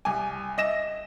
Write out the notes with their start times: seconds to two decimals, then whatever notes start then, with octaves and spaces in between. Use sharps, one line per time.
0.05 C2 G#5
0.58 D#5 E5 A#6 E7